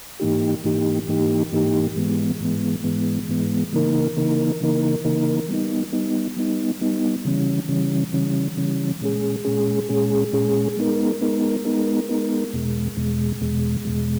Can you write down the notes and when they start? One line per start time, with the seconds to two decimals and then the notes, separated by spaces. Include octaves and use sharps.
0.20 G#2 E3 A#3 D#4 G4
0.64 G#2 E3 A#3 D#4 G4
1.08 G#2 E3 A#3 D#4 G4
1.53 G#2 E3 A#3 D#4 G4
1.96 G#2 E3 G#3 B3
2.40 G#2 E3 G#3 B3
2.84 G#2 E3 G#3 B3
3.29 G#2 E3 G#3 B3
3.73 C#3 E3 A#3 D#4 A#4
4.17 C#3 E3 A#3 D#4 A#4
4.60 C#3 E3 A#3 D#4 A#4
5.04 C#3 E3 A#3 D#4 A#4
5.48 G3 B3 D#4
5.92 G3 B3 D#4
6.36 G3 B3 D#4
6.81 G3 B3 D#4
7.25 C#3 E3 G3 C#4
7.68 C#3 E3 G3 C#4
8.13 C#3 E3 G3 C#4
8.57 C#3 E3 G3 C#4
9.01 A#2 G#3 C#4 G#4
9.45 A#2 G#3 C#4 G#4
9.89 A#2 G#3 C#4 G#4
10.33 A#2 G#3 C#4 G#4
10.77 G#3 B3 D#4 A#4
11.21 G#3 B3 D#4 A#4
11.65 G#3 B3 D#4 A#4
12.09 G#3 B3 D#4 A#4
12.53 E2 B2 G#3
12.97 E2 B2 G#3
13.41 E2 B2 G#3
13.85 E2 B2 G#3